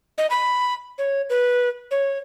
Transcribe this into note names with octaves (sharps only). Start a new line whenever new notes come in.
D#5
B5
C#5
B4
C#5